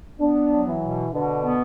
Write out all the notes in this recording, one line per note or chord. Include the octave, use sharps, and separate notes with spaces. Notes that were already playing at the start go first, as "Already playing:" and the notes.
B3 D4
F#3
E3
B2
B2 D3
B3